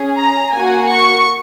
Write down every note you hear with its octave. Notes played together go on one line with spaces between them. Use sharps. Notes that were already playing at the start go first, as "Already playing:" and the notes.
Already playing: C#4 G#4
A#5
A#3 F#4 G#5
C#6